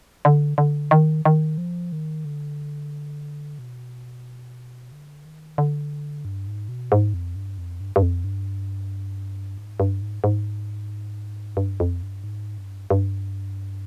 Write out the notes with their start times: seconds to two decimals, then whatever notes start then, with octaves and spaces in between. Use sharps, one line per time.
0.25 D3
0.58 D3
0.91 D#3
1.25 D#3
1.58 F3
1.92 D#3
2.25 D3
3.59 B2
4.92 D3
5.25 D#3
5.58 D3
6.25 G2
6.47 G#2
6.69 B2
6.92 G#2
7.14 F2
7.36 G2
7.58 F2
7.81 G2
7.96 G2
8.02 F2
8.24 G2
9.58 G#2
9.80 G2
10.02 G#2
10.24 G#2
11.57 G2
11.80 F2
12.02 G2
12.24 G#2
12.58 G2
12.90 G2